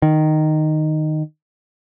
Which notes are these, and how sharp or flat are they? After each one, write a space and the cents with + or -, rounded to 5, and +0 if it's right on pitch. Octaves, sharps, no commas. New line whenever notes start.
D#3 -10